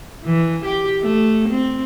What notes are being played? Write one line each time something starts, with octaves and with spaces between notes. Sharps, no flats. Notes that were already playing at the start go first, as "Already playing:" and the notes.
E3
G4
A3
C4